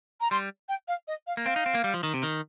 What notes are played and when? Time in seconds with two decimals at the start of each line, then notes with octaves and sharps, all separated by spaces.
0.21 A#5
0.31 G3 C6
0.69 G5
0.88 F5
1.08 D#5
1.27 F5
1.37 A#3
1.45 C4 F5
1.56 D#4
1.66 C4
1.75 A#3
1.84 G3
1.94 F3
2.03 D#3
2.14 C3
2.23 D#3